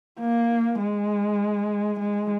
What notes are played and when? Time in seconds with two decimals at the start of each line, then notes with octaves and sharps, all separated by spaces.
0.20 A#3
0.79 G#3
2.00 G#3